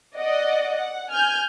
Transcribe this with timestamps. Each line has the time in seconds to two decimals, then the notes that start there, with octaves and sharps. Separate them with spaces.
0.17 D5 D#5 F#5
0.77 F#5
1.11 G#5 F6 G6